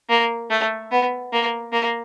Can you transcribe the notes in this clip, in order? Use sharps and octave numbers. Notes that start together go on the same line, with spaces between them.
A#3
A3
B3
A#3
A#3